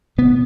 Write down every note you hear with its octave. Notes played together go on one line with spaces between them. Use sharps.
B2 B3